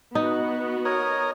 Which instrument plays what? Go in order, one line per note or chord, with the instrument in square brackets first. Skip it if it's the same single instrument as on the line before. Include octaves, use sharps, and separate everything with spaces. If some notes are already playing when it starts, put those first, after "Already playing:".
[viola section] B3 F#4 [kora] D#4
[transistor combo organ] A#4 D#5 [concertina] C#5